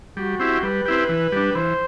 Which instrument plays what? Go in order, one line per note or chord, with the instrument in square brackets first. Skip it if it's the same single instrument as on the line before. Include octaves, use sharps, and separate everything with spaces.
[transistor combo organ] G3 [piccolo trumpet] F#4
[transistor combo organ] C4 E4 G4
[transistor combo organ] G3 [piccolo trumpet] B4
[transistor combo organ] C4 E4 G4
E3
G3 D4
[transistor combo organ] E3 [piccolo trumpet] C5